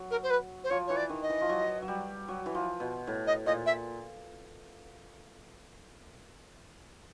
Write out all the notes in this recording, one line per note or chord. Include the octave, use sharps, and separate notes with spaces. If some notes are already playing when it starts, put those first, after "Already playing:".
Already playing: F#3
A#4
C5
B4
C5
F3 C#5
E3 C#5
D5
D#3
D#5
E3
F3
F#3
F#3
G3
F#3
E3
F3
B2
A2
D#5
A#2 D#5
E5